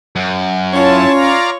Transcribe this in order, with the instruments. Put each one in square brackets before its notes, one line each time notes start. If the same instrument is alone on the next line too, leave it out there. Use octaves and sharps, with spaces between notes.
[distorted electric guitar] F#2
[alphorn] C#4 [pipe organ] E4 A5 [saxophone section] F4 C#5
[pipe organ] D5 F5 A#5